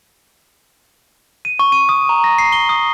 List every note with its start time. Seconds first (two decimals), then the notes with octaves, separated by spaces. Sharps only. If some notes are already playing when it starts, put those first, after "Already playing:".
1.45 D#7
1.59 C#6
1.72 D#7
1.89 D#6
2.09 A#5
2.24 A#6
2.38 C7
2.53 G7
2.69 D#6